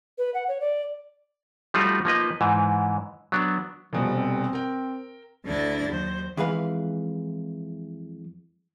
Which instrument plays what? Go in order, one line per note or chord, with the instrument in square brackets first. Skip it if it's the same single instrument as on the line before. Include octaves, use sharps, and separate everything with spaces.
[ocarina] B4
F#5
C#5
D5
[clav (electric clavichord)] F3 G3 A3 D#4 F4 F#4
F3 A#3 D#4 B4 D#5
G#2 E3
F#3 B3 D4
[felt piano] F1 B2 G3 [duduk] F3
[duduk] C4
[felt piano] A#4 G5
[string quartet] D2 D3 D4 E4 A6 A#6
D#2 F#3 C5
[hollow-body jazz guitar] F2 E3 G#3 B4 F5